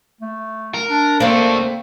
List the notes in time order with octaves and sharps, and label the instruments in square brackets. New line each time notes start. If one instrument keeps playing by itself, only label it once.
[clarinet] A3
[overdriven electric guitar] A#4
[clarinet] D4
[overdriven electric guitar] A3 D4 [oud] A#3 C4 [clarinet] C5